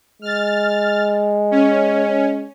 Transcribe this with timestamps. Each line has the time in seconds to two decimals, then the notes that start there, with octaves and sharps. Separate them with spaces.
0.22 G#3 F6 A6
1.51 C#4